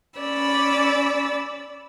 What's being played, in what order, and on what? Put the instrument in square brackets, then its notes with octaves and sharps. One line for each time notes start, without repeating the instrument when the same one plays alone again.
[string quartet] C#4 D5 B5 E6